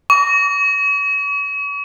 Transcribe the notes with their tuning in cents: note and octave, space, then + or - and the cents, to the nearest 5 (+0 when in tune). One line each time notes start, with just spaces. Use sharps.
C#6 +40